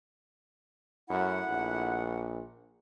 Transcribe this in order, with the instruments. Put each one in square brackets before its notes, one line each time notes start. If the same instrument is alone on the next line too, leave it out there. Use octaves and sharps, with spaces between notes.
[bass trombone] F#2 [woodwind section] A3 E4 F#5
[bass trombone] A#1